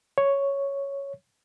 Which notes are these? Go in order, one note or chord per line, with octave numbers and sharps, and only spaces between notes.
C#5